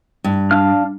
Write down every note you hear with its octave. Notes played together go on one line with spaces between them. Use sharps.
G2
D4 F5 F6